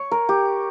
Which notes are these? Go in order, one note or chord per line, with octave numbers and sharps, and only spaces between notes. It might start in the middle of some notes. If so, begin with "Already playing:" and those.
Already playing: C#5
A#4
G4